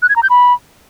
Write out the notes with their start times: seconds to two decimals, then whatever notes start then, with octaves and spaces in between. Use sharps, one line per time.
0.02 F#6
0.09 G#6
0.16 A#5
0.23 G6
0.30 B5